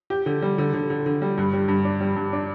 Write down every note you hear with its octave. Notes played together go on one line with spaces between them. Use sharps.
G4
D3
G3
D3
D3
D3
D3
G3
G2
G3
G2
D4
G3
G2
D4